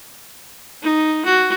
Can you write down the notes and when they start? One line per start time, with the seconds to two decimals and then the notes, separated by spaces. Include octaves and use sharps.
0.82 D#4
1.25 F#4